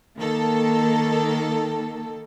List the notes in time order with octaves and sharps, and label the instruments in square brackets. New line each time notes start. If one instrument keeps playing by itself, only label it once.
[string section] D#3 A#3 A4